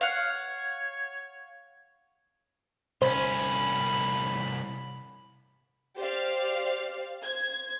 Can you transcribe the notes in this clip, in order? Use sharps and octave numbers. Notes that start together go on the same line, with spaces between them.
C#5 F5 F#5
C2 C#4 C5 B5
G4 C5 D5 F5
C5 G#6